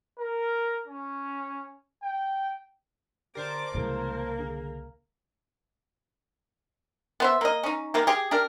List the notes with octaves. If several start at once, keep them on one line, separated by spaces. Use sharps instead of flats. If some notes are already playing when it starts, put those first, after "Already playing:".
A#4
C#4
G5
D3 G4 A#4 C5 D5 A5 D6
C2 C#3 E3 G#3 A#3
D3 G#4
B3 C5 E5
A#3 D#5
C#4 D#4
D#3 A#3 G4
G4 G#4
D4 G4 A#4